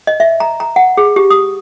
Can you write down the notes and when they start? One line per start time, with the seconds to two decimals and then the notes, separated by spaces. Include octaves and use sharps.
0.07 D#5
0.20 E5
0.40 A#5
0.60 A#5
0.76 F#5
0.97 G#4
1.16 G4
1.30 D#6